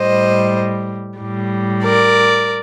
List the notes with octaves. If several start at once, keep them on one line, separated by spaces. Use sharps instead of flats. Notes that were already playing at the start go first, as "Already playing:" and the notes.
Already playing: A2 G3 C5 D#5
A2 G3
A#4 D5